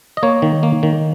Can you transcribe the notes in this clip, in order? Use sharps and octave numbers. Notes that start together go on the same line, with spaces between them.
D#5
A#3 C#5
D#3
A#3
D#3